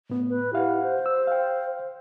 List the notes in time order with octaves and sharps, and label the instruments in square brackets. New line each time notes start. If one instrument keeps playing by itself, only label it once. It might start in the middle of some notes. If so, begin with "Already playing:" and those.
[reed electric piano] A2 B3
[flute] B4
[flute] E4 [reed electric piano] G4 F5 F#5
[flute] C5
[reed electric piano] E6
F5 G5